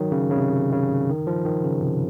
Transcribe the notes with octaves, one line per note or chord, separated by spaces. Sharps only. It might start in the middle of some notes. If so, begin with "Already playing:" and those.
Already playing: D#3 F#3
C#3
C#3
C3
C#3
D#3
F3
D#3
C#3
C3